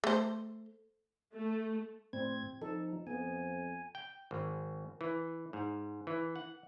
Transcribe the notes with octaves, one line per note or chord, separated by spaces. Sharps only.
A3 C5
A3
A2 C4 G#6
F3 D#4 A4
F2 B3 G#5
G5
G#1
E3
G#2
E3
F#5